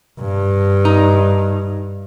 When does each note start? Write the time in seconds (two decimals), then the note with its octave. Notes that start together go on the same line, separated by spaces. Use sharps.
0.20 G2
0.85 D#4